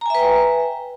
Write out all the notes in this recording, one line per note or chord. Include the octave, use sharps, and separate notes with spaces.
B4 E5 G5 G#5 A#5